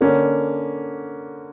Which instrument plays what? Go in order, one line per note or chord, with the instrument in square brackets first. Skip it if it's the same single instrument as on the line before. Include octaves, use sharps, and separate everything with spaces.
[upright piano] D3 A#3 C#4